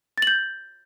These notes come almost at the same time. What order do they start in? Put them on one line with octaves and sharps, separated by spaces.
A6 F#7 G6